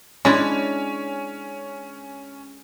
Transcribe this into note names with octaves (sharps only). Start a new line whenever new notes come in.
G#3 C#4 D4 E4